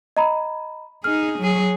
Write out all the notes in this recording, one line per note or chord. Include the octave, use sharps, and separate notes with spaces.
D#5 A#5 B5
D#4 G#4 F6
F#3 G#4